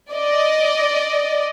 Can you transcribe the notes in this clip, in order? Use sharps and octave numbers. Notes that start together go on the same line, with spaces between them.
D5 D#5